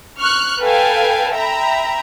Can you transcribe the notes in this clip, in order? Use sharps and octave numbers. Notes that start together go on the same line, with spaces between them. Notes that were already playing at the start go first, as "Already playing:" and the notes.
C#6 F6 F#6
A4 B4 F5 G5 G#5
E5 G5 A#5 B5